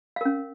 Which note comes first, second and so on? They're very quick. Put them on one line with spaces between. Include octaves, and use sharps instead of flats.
F5 A#4 C#4